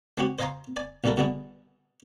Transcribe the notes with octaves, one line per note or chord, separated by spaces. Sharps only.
G#3 C4 C#4 F#4 G4
C5 D#5 F5 G#5 A#5 C6
D5 G#5
B1 A#2 G3 E4 A4 A#4
B2 D3 G3 E4 G#4